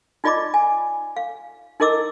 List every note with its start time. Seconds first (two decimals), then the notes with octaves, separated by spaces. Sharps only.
0.24 D#4 F4 D5 D#5 B5 D6
0.54 G#5
1.16 F5
1.80 D#4 E4 A#4 D#5 D6 E6